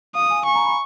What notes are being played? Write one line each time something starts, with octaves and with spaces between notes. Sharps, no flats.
F5 D#6
G#5
G#5 C#6
A#5
B5